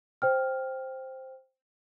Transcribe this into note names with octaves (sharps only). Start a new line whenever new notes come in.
C5 G5 F6